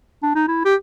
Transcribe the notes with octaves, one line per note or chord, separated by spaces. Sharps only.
D4
D#4
E4
G4